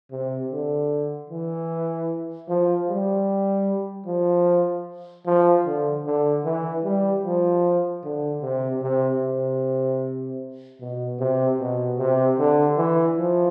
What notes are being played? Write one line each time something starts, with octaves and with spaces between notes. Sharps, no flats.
C3
D3
E3
F3
G3
F3
F3
D3
D3
E3
G3
F3
D3
C3
C3
C3
B2
C3
B2
C3
D3
E3
F3